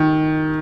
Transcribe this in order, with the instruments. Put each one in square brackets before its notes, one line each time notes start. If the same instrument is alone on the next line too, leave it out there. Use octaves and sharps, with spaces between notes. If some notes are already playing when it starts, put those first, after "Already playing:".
Already playing: [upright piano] D#3